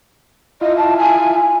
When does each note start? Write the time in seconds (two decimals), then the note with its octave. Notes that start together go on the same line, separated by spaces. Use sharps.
0.61 E4 F4 D#5
0.77 A5
0.98 G#5